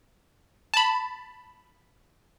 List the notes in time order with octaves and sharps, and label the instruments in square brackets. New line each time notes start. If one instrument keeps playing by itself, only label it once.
[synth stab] A5 B5